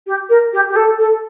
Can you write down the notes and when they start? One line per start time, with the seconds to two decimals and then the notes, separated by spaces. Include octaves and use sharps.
0.07 G4
0.29 A#4
0.53 G4
0.70 G4
0.76 A4
0.98 A4